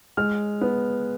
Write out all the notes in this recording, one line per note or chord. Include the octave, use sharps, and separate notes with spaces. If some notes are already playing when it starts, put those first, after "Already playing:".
G#3 F6
B3